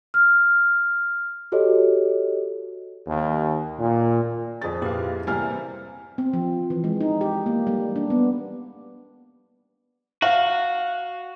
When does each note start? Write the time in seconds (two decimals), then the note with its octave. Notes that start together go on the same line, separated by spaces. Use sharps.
0.14 F6
1.52 F#4 G4 A4 C#5 D#5
3.07 D#2
3.79 A#2
4.62 F2 G#4 A6
4.82 A#2 E4 G4 B4 F5
5.27 C3 E3 G3 A#3 C4 E4 G#5 F6
6.18 C4
6.33 F3
6.70 E3
6.84 G#3
7.01 D#4
7.21 G4
7.46 A#3
7.67 G3
7.96 D4
8.10 B3
10.22 F#4 F5